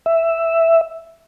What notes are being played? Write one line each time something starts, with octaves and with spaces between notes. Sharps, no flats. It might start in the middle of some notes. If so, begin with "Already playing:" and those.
E5